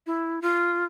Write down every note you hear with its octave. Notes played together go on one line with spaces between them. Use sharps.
E4
F4